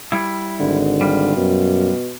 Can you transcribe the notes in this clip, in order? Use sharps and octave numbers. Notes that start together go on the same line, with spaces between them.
G3 E4
G#1 D3
G3 F4
F#2 B2